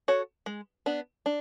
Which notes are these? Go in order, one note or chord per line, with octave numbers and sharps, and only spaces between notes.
F#4 A4 C#5
G#3
B3 D4
D4